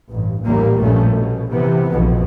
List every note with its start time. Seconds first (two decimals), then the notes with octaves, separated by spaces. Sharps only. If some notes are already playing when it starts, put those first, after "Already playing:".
0.11 A1 G2
0.43 A1 D#2 A#2 G3 A#3
0.78 A#1 G2 A#2 F3 A3 C#4
1.12 B2
1.51 C3 E3 B3
1.91 A#1 F2 B2